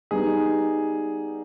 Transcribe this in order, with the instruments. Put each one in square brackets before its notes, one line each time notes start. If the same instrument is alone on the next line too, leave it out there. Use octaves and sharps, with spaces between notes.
[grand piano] G3 B3 D#4 [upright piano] G#4